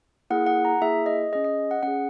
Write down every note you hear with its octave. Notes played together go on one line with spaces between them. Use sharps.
A#3 E4 G#4 F#5
F#5
A#5
A#3 E4 G#4 E5
D#5
C#4 G#4 D#5
D#5
F#5
C#4 G#4 F#5